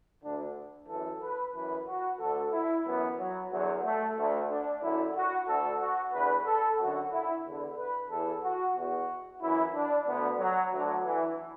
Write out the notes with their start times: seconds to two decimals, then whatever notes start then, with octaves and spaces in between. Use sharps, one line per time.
0.23 D2 D3 D4
0.88 F#2 E3 A4
1.22 B4
1.54 F#2 E3 B4
1.88 F#4
2.20 D2 D3 A4
2.53 E4
2.86 F#2 E3 B3
3.18 F#3
3.51 E2 D3 F#3
3.84 A3
4.16 D2 D3 A3
4.50 D4
4.82 F#2 D3 E4
5.15 F#4
5.48 D2 D3 A4
5.80 F#4
6.13 E2 D3 B4
6.46 A4
6.79 F#2 F#4
6.84 D3
7.11 E4
7.45 E2 D3
7.77 B4
8.10 E2 E3 A4
8.44 F#4
8.76 E2 B2 F#4
9.41 F#2 E3 E4
9.74 D4
10.07 D2 D3 B3
10.40 F#3
10.72 D2 D3 F#3
11.05 E3